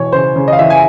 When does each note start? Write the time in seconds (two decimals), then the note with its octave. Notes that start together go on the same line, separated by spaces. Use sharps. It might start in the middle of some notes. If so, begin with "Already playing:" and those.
Already playing: B2 E3 C#5
0.12 C#3 C5
0.36 C#3
0.48 D#5 F5
0.59 E3 E5
0.70 G#5